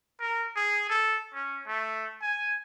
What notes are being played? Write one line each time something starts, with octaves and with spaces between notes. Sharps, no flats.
A#4
G#4
A4
C#4
A3
G#5